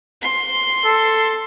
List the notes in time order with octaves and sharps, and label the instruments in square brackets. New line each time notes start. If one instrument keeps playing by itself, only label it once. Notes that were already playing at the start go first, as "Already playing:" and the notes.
[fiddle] C6
[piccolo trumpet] A4